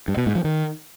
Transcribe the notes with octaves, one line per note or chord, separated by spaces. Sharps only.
G2
B2
G#2
F3
D#3